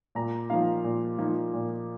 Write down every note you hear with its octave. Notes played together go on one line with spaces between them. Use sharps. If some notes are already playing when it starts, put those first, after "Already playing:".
A#2 A#5
F3 A#3 D#4 F5
A#2
F3 A#3 D#4
A#2